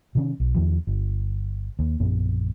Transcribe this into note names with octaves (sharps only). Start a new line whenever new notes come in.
C3 D#3 C#4
B1
E2 D#3 F3
G1
D#2
A#1 F#2 B3